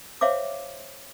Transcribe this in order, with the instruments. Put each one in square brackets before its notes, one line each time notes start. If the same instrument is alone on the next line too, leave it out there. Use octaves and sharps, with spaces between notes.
[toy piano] C5 C#5 E5 F5 D6